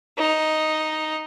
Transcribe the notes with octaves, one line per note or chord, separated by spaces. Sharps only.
D#4